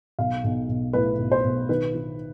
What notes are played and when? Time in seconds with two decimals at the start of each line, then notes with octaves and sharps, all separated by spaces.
0.19 B1 F5
0.44 B1
0.69 B1
0.93 A2 B4
1.19 B1
1.32 C5
1.44 B1
1.69 D#3 B4
1.95 D#3